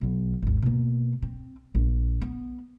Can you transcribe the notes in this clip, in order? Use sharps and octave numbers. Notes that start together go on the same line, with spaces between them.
B1 B3
G#1 D#2
B2 A#3
C4
A#1
B3